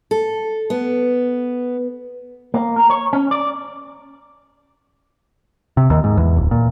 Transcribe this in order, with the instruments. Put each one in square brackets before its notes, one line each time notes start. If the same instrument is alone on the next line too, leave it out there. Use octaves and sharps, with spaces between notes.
[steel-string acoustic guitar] A4
B3
[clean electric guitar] A#3
A#4
C#5
C#4
D5
[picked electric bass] C3
D#2
G#2
E2
D1
A#2